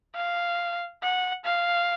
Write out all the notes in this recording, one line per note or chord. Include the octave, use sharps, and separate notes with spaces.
F5
F#5
F5